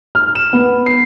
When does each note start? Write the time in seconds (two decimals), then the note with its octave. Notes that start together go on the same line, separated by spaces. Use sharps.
0.15 F6
0.35 E7
0.53 B3
0.86 C7